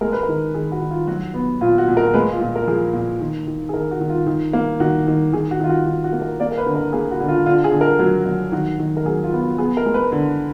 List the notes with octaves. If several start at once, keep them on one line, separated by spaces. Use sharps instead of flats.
G#3 A#4
B4
A#4
D#3
D#3 G#4
F#4
D#3
F4
F#3 F#4
B3
A#2 F4
F#4
A#2
A#4
G#3 B4
F4
A#2
A#4
F3 G#4
A#2
D#3
D#3
G#4
D#3 A#4
F#4
D#3
F4
D#3
A#3
D#3 F#4
D#3
D#3 G#4
F#4
D#3 F4
F#4
D#3 F#4
F#4
A#3
A#4
A#3 D5
A#4
B4
D3
A#4
A#3 G#4
F#4
D3
F4
D3 F4
G#4
D3
A#4
F#3 F#4
F#3
D#3 F#4
D#3
A#4
F#3 G#4
F4
B3
F#4
B3 G#4
A#4
G#3
B4
D3